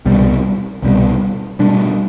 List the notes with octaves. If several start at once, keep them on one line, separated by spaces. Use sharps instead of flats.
C2 B2 G3
C2 B2 G3
B2 G3 D4